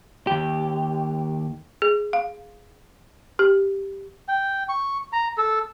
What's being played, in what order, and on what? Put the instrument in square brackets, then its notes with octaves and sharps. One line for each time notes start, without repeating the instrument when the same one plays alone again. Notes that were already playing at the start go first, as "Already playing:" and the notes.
[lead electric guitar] D#2 G4
[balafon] G#4
F5
G4
[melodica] G5
C#6
A#5
A4